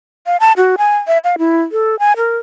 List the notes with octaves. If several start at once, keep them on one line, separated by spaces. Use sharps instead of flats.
F5
A5
F#4
G#5
E5
F5
E4
A4
G#5
A#4